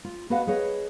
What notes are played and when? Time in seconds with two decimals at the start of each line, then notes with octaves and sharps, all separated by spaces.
0.05 F4
0.30 B3 F#4 B4 D#5 F5 F#5
0.47 G#4 B4 C#5 D#5